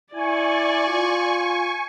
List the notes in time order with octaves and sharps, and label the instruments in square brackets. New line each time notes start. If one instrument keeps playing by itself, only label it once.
[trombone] E4 [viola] D5 [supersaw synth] G#5 C#6
[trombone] F4